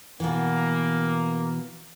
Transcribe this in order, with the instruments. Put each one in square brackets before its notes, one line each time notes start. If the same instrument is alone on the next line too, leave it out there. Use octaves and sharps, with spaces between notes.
[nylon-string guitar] B2 E3 [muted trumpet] A#3